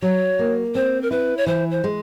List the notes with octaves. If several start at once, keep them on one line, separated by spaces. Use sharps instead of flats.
F#3 C#5
A#3
C4 C5
A#4
E4 B4
C#5
E3 C5
C5
G#3